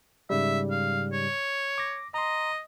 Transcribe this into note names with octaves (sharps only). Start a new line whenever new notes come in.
G#2 C#3 G3 E5
F5
C#5
D6 A#6
D#5 A#5 C6